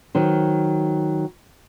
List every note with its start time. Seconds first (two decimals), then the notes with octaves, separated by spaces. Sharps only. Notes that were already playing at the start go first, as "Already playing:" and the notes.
0.15 D#3 F#3 C5